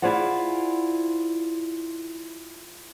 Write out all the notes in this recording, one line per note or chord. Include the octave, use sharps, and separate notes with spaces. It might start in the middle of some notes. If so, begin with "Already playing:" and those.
E4 F4 G#4 C5 D5 F#5